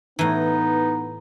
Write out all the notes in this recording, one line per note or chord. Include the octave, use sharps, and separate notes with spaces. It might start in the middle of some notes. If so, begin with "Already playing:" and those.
A2 E3 B3 D#4 A#5